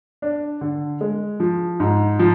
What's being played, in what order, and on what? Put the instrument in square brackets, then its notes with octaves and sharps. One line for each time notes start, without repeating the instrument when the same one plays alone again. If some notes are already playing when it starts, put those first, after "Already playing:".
[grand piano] D4
D3
G#3
F3
G#2
F3